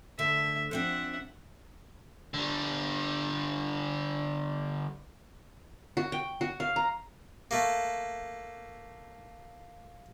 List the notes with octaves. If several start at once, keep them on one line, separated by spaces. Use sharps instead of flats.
D2 D3 E5 A5
F3 C4 D4 E5 F#5
D3 G3
F#4
G5
F#4
F5
A#5
A3 A#3